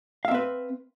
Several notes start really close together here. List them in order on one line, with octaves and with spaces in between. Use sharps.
F5 E5 C4 B4